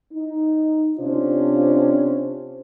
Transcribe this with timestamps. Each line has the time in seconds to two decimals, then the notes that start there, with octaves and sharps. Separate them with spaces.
0.13 D#4
0.98 C3 C#4 D4 F4 C5